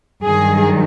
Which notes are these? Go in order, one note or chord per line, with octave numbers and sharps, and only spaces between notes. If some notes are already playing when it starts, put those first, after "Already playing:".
G2 D#3 F#3 G#4